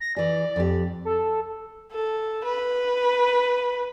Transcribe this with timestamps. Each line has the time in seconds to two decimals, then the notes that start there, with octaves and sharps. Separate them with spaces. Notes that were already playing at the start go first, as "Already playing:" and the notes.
0.01 A#6
0.16 E3 G#4 D5
0.56 F2 G4
1.05 A4
1.91 A4
2.45 B4